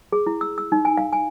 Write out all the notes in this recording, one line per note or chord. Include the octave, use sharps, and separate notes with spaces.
G#4
E4
E6
E6
D#4
G#5
F5
G#5